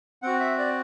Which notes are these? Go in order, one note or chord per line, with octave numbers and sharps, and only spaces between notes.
C4 F#4 F#5
E5
D5